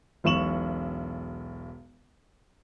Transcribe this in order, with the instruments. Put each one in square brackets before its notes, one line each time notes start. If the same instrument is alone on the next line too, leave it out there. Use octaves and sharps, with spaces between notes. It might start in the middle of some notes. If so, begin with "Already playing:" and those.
[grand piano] E1 B1 C#6 E7 F#7